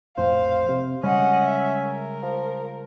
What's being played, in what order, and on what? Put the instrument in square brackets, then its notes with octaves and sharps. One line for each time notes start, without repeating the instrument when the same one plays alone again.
[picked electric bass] A#1 F2 A2 [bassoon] C5 [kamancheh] F5
[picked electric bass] C3
[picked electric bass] C#3 G3 G#3 [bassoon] C#4 [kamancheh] D#5 F#5
[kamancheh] E5
A#4
[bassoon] F3